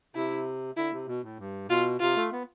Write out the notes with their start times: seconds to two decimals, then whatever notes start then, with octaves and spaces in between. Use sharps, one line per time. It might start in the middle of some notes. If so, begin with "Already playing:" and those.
0.15 C3 E4
0.77 D3 E4
0.92 C3
1.08 B2
1.24 A2
1.39 G2
1.69 B2 F4
2.00 C3 F4
2.16 A3
2.32 B3